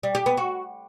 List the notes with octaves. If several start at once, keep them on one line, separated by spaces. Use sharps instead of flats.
G3
G4
B3
F#4